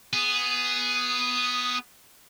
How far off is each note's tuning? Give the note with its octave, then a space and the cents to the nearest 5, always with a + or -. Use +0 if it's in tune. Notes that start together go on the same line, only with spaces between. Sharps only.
B3 +0 G#4 +0